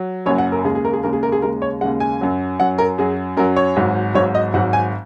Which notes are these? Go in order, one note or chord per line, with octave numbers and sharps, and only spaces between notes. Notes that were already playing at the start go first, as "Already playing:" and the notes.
Already playing: F#3
F#1 F#2 F#3 C#5
F#5
A#4
D#2 C#3 G#3 G#4
G#4
A#4
G#4
D#2 C#3 G#3 A#4
G#4
A#4
G#4
D#2 C#3 G#3 A#4
C#5
D#2 C#3 G#3 F#5
G#5
F#2 F#3
F#2 F#3 F#5
A#4
F#2 F#3 G#4
F#2 F#3 A#4
C#5
G#1 G#2 F#3
G#1 G#2 F#3 C#5
D#5
G#1 G#2 F#3 F#5
G#5